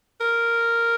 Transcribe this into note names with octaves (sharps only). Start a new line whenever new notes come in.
A#4